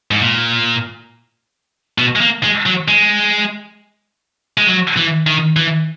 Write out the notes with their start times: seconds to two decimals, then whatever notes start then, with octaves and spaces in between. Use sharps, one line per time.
0.11 G#2
0.21 A#2
1.98 B2
2.16 G#3
2.21 A#3
2.43 G#3
2.66 F#3
2.88 G#3
4.58 G#3
4.67 F#3
4.97 E3
5.27 D#3
5.56 E3